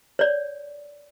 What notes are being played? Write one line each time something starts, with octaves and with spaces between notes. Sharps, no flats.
C#5 D5